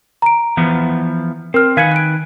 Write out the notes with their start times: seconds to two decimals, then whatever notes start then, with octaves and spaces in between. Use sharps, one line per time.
0.22 A#5 D7
0.57 E3 F3 B3
1.54 C4 A#4 F6
1.77 D#3 B4 F5 G#5 G#6 C#7
1.92 F#6 D7